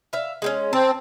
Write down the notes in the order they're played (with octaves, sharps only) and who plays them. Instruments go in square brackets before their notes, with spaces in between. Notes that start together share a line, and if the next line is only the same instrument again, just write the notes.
[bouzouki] E5 F5
G#3 C4 C#4
[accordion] C4 [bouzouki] A5